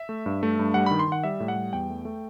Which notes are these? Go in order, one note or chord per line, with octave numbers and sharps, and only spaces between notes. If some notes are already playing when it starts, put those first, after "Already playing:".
Already playing: E5
A3
G2
A3
G2
G3 F#5
D#3 B5
C6
D#3 F#5
G3 E5
A2
F#5
G3
E2 G5
A3
A3